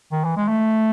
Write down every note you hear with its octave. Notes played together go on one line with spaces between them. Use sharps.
D#3
E3
G#3
A3